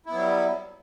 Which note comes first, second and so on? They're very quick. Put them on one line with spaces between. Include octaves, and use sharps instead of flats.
E4 B3 F#3 G3